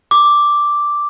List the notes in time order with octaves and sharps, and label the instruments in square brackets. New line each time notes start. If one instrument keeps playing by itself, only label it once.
[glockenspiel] D6